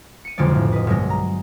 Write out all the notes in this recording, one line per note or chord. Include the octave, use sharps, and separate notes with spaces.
C#7 D#7
F#1 B1 F2 D3 G#3 D5
A2
B4 D#5
B1 G2 G#3 A#6
A#5